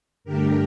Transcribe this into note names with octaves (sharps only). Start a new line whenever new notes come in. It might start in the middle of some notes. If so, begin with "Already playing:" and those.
G2 D3 A3 D4 G4 A#4